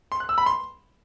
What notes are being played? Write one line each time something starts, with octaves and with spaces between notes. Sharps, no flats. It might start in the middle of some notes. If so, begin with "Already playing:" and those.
C6
F#6
E6
B5
C6